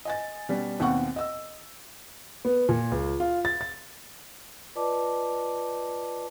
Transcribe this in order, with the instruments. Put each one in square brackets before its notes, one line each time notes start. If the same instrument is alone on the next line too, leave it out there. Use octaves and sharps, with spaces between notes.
[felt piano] D#5 G#5 A6
B2 G3 C#4
D#2 B2 C4 F#5 C#6
D#5 E6
[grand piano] B3
A#2
C#2
F4
A6
A6
[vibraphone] F4 B4 D5 D#5 A5 D6